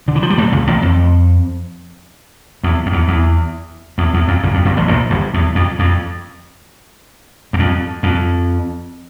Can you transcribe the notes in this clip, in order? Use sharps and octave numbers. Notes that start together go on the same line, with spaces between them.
D3
E3
F3
G3
A2 A3
C#2 C#3
A1 A2
F2
E2
F2
E2
E2
E2
E2
F2
G1 G2
F2
G1 G2
A1 A2
A#1 A#2
G1 G2
E2
F2
F2
E2
F2
F2